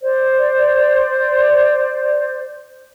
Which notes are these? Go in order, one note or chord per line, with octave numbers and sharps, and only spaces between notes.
C5 D5